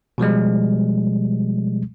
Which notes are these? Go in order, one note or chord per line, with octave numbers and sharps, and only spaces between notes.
B2 F3 G3 G#3